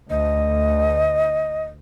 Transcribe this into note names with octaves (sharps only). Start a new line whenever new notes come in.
D2 D#5